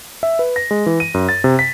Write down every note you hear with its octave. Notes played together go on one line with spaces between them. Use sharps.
E5
B4
A#6
G#3
E3
D#7
F#2
A6
C3
B6